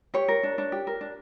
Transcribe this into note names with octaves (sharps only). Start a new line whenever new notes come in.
G4 C#5
A#4
D4
D4
G4
A#4
D4